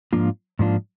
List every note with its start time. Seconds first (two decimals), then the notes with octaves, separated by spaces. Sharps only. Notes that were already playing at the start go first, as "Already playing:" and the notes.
0.13 G#2 F3 A#3 D4 F4
0.59 G#2 F3 A#3 D4 F4